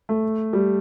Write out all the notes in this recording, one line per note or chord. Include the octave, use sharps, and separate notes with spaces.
A3
G3